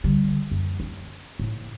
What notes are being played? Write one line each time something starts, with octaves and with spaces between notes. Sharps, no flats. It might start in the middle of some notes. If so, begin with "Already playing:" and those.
D3 G3
F#2
C#4
A2